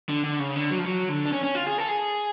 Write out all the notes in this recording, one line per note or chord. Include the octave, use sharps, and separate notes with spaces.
D3
D3
C#3
D3
F#3
F3
F#3
D3
D4
C#4
C#4
F4
G#4
A4
G#4